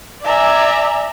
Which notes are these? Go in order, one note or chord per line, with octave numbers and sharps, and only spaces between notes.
D5 E5 G#5 A#5